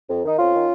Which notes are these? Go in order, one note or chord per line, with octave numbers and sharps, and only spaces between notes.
F2
D#3 D#4
F2 C#4 F4
D#3